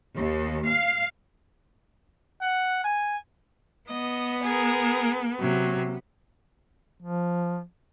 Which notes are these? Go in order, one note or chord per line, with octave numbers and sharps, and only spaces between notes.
D#2
F5
F#5
G#5
B3 D#5
G#4 A#4
C3 F#3
F3